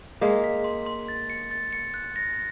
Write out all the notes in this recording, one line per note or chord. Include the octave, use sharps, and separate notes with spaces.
G#3 A#3 B6
B6
C6
C6
A6
C#7
A6
C#7
F#6
A#6